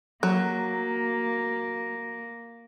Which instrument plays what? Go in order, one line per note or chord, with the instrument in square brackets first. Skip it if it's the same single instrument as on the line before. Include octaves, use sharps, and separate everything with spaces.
[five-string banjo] F#3 [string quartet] A#3